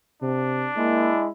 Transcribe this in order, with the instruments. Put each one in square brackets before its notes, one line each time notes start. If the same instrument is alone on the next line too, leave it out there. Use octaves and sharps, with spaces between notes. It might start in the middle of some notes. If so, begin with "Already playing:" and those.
[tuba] C3 [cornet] D4
[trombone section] G#3 E4 [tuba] A#3